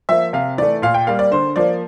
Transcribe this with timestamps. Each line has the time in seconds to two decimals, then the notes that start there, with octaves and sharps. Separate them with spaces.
0.09 F3 A#3 E5
0.33 C3 F5
0.58 E3 A3 D5
0.82 A#2 F5
0.94 G5
1.07 G3 A#3 F5
1.19 D5
1.31 D3 C5
1.56 F3 A#3 D5